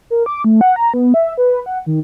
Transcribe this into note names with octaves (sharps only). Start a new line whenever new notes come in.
A#4
D6
A3
F#5
A#5
B3
E5
B4
F#5
D#3